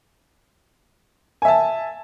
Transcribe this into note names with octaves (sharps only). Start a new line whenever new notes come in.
E5 G#5 A5